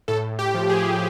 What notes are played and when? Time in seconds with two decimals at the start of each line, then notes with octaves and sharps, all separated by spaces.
0.08 A2 A4
0.39 G4
0.54 F3
0.70 G#4
0.93 G#4